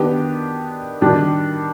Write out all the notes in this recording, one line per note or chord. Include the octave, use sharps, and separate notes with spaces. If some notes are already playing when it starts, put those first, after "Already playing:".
Already playing: D#3 B3 D4 G4
D#3 G3 D4 G4